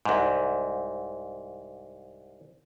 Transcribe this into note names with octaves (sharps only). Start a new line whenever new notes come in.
C2 G#2